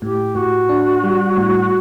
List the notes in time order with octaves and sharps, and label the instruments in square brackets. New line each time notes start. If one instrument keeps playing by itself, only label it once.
[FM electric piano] A2 [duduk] G4
[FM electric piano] A2 [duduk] F#4
[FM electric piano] D4
G3
A2